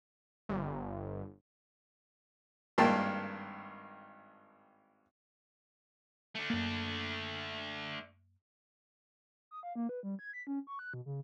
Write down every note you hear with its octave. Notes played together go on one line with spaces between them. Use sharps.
G1
G#1 G2 A#3 A#4 G5 A5
A3 D4
F#2 A#3
D#6
F5
A#3
B4
G3
G#6
B6
C#4
C#6
F#6
B2
C#3